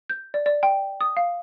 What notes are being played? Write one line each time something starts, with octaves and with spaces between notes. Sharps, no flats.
G6
D5
D5
G5
D#6
F5